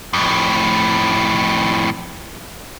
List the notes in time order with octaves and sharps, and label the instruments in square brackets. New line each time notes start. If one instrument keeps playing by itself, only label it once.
[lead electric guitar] F2 A2